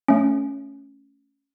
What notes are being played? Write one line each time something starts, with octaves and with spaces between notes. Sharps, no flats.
A3 C#4